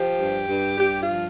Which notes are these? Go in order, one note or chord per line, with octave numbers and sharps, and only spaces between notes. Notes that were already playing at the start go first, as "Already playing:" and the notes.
Already playing: F3 G4
G2
G2
G2 G4
F4
F3